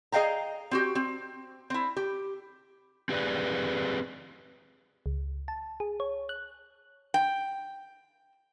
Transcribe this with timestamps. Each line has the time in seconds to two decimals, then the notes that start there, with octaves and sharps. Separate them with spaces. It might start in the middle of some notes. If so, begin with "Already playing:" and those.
0.12 G#4 D#5 F5 G5 A#5
0.71 C4 F#4 G4
0.95 C4
1.70 C4 E4
1.97 G4
3.09 C4 G4 G#4 B4 D5
5.06 C#2
5.48 A5
5.80 G#4
6.00 C#5
6.29 F#6
7.14 G5